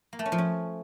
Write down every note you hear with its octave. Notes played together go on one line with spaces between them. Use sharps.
A#3
A3
C#4
F3
C#4